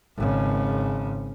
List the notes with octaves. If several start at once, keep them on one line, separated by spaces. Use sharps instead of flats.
G#1 C#3